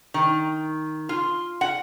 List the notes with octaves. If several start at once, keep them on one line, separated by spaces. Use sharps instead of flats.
D#3
F4
F#5